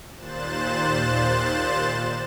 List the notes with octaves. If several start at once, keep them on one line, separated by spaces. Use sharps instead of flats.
D#2 A#2 C5 F#6 A6 E7